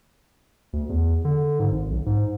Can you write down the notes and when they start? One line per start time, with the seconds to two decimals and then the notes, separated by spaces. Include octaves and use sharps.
0.73 D2
0.89 E2
1.25 D3
1.59 G#2
1.71 G#1
1.90 B1
2.06 G#2